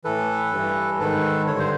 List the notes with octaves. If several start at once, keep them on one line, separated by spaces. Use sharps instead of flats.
A2 E3 A4 B4
G2 E3
G#2 D#3 A4 B4
G2 D3 C#5
C5